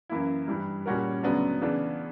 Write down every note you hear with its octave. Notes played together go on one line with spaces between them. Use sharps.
F#2 E3 A#3 E4
G2 E3 G3
A#2 G3 C#4 F#4 A#4
D2 C#3 F#3 B3 D4
C#3 E3 B3 D4